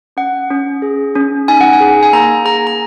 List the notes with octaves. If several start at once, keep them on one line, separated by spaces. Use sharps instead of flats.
C#4 F#5
C#4
G#4
C#4
D#4 G#5
F#5
G#5
G#4
G#5
A#3 A#5
G#4 A#5
A#5